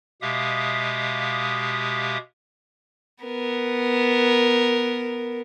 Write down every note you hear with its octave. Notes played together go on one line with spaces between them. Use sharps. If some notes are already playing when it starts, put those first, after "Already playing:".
B2 G#3 G4 E5 F5 D#6
B3 A#4